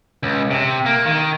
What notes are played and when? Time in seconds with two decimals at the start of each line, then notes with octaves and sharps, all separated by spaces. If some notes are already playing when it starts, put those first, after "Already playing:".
0.23 C#2
0.51 C3
0.86 A#3
1.06 D#3